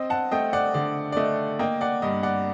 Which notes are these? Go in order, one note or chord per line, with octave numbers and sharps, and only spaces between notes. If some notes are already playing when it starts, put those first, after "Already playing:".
Already playing: C4 D#5
F#5 A5
A3 D#5 G5
D5 F#5
D3 D5
D5
A3 D#5
A#3 D#5 G5
D5 F#5
G2 D#5
D5 F#5